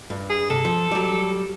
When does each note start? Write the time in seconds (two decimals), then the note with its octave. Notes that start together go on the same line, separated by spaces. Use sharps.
0.10 G2
0.30 G#4
0.50 C3 A4
0.65 F3
0.91 F#3 G3